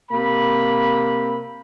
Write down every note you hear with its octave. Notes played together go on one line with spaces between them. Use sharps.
C3 A#3 B5